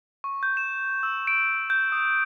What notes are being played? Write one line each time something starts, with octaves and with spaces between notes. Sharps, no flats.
C#6
G6
E7
E6
D7
G6
D#6